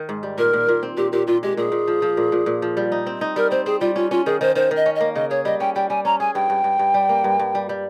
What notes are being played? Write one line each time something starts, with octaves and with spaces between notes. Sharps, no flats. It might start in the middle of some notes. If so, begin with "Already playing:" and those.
Already playing: D#3
G#2
G3
A#2 A#4
A#2
A#2
C4
A#2 G4
A#2 G4
A#2 F4
G#3 G4
A#2 G#4
A#2
F3
F3
A#2
A#2
A#2
F3
G3
D#4
C4
D#4
G3 A#4
C4 C5
C4 G#4
G3 F4
C#4 F4
C#4 F4
D#3 G#4
D#3 C5
D#3 C5
D#3
D#5
C#4
A#3 D#5
C#3 D#5
G#4 C#5
G3 D#5
C#4 G5
G3 G5
G3 G#5
C#4 A#5
G#4 G#5
G2 G5
G2
G2
G2
G3
A#3
G2
G2
G3
G3